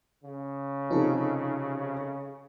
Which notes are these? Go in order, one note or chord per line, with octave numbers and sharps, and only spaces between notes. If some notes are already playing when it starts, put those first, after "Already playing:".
C#3
C3 F3 D#4 A4